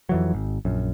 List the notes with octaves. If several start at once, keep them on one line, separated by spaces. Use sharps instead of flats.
F2 E3 F#3
G#1
A#1 F#2